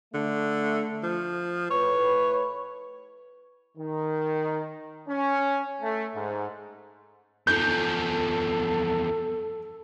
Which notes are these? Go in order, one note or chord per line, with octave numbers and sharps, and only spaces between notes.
D3 A3
F3
A2 B4 C#5
D#3
C#4
A3
G#2
E2 F3 A4 G6